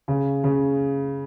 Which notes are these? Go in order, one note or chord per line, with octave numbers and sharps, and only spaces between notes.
C#3
C#3